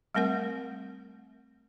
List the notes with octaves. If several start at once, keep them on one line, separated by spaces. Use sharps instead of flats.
G3 A3 C4 A#4 F#5